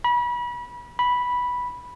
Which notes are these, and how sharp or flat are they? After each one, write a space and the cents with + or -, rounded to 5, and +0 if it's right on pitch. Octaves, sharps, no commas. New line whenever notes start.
B5 -35
B5 -10